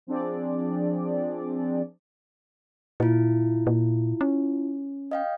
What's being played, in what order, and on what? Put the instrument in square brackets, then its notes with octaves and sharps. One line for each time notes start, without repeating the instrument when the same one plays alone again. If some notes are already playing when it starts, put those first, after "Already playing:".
[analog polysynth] F3 C4 D4 G#4 D5
[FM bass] A#2 [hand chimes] E4 F4
[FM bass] A#2
C#4
[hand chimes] D#5 F5 G5